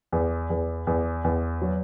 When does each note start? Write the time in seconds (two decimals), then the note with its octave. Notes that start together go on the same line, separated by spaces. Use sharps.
0.12 E2
0.50 E2
0.87 E2
1.24 E2
1.61 F#3